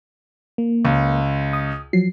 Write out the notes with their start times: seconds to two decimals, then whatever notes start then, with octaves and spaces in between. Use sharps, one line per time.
0.58 A#3
0.85 C#2
1.53 D#6
1.93 F3 F#3 C7